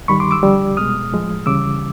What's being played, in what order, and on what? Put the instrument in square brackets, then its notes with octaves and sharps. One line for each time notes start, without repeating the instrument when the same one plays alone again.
[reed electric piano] G2 D#3 G3 B5 C#6
C6 D6
D6 E6
F2 D3 G3
C2 B2 G#3 D#6 F6
A2 F3 G#3
D2 C#3 E3 G3 D6 E6